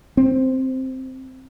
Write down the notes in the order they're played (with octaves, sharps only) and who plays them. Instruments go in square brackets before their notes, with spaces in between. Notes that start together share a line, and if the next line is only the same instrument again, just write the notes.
[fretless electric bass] C4